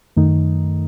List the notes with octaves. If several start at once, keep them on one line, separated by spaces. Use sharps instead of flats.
F#2 D#3 A3 D#4